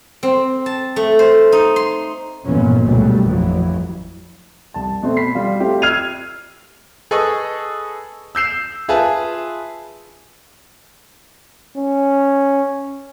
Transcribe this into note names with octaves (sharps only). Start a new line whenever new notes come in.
C4
A5
A3
C5
D#4
C6
G1 F2 A#2 E3 B3 C#4
C#2 B2 D3 F#3 G3 A3
A1 F2 E3 F#3
C2 A5
B2 A3 C4
B5 B6 C7
G3 F4
A3 C4 F4 G4
E6 F6 G#6 C7 D#7 F7
G#4 A4 B4 D#5 C#6
E6 G6 C7 E7
F4 G#4 B4 E5 A5
C#4